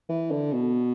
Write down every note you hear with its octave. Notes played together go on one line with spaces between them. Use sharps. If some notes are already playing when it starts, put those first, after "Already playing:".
E3
D3
B2